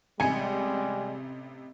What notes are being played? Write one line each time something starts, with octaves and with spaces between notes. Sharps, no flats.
A1 C3 G3 G#3 G#5 C#7